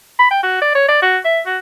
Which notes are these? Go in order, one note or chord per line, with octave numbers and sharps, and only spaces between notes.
B5
G5
F#4
D5
C#5
D5
F#4
E5
F#4